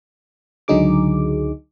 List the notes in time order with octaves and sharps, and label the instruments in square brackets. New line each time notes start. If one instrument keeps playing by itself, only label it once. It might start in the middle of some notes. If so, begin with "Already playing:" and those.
[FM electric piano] C#2 D3 F#3 D#4 G#4 D6